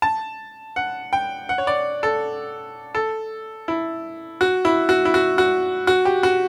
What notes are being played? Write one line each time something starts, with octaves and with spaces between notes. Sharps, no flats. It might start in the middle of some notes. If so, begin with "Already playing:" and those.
A5
F#5
G5
F#5
C#5
D5
A4
A4
E4
F#4
E4
F#4
E4
F#4
F#4
F#4
G4
F#4